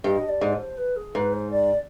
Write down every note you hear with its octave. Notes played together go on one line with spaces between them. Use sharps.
G2 D#5
D5
G#2
C5
B4
G#4
G#2 B4
C5
D5